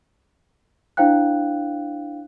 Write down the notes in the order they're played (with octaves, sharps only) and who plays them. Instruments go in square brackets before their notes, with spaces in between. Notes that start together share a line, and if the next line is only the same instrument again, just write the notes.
[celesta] D4 E4 C5 F5 G5 F#6